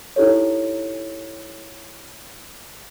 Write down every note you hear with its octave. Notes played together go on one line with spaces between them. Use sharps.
D#4 E4 G4 A4 C#5